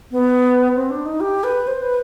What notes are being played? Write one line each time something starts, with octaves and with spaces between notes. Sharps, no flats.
B3
C4
D4
D#4
G4
B4
C5
B4